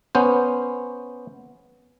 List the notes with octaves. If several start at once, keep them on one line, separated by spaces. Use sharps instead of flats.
B3 C#4 C5